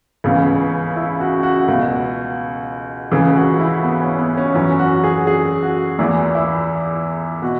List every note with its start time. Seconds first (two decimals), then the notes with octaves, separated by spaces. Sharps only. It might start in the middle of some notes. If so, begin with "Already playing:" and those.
0.24 C#2 C#3 E3 B3
0.96 E4
1.20 F#4
1.43 F#4
1.68 C#2 B2
3.11 C#2 C#3 E3 G#4
3.36 F#4
3.59 E4
3.83 B3
4.01 C#4
4.19 B3
4.37 C#4
4.54 F#2 E3 C#4
4.79 F#4
5.04 G#4
5.27 G#4
5.62 F#4
5.99 E2 E3 E4
6.35 E4
7.42 B2 F#4